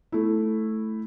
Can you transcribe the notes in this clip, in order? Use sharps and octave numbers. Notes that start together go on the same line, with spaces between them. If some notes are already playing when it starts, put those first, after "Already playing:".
A3 E4